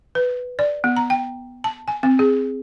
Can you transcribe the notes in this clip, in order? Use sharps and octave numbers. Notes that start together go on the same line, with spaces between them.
B4
D5
B3
A#5
G5
A5
G#5
C4
G#4